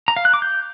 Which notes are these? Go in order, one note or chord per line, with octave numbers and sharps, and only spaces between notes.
A#5
F5
F#6
D6
G6